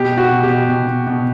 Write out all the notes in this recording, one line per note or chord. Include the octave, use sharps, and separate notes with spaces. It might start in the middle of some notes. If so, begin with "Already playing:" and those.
Already playing: B2 G4
B2
F#4
B2
G4
B2
B2
B2
B2